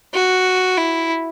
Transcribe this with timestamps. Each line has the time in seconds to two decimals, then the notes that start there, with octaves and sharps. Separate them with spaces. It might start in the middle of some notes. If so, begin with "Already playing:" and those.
0.14 F#4
0.77 E4